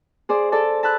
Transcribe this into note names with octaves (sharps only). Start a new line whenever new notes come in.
G#4 C5 D5
A4 D5 A5
A5 B5 E6 F#6